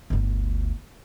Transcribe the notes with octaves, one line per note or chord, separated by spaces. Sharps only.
G1 D2